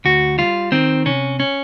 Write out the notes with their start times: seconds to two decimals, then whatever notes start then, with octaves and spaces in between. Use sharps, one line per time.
0.05 D2 F#4
0.38 G3 F4
0.72 D#3 C4
1.06 C3 C#4
1.40 C#4